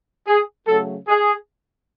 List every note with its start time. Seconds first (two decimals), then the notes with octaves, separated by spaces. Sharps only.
0.27 G#4
0.67 C#3 F#3 A3 A4
1.08 G#4